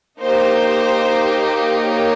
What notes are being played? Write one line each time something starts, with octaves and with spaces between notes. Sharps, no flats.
A#3 D#4 G4 C5
C#5